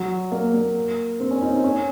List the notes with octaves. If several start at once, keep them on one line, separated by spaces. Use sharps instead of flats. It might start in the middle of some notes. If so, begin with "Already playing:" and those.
Already playing: F#3
A#3
A#3
C4
C#4
D#4
C4
C#4